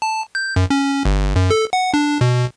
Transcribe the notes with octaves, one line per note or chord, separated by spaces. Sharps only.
A5
G6
F#2
C#4
G1
F#2
A4
F#5
D4
B2